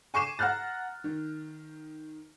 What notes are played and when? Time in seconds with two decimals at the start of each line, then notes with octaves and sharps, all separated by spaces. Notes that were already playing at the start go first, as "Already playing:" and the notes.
0.14 G#5 C#6 D6 C7 E7
0.39 F#5 A#5 F6 F#6 A6
1.04 D#3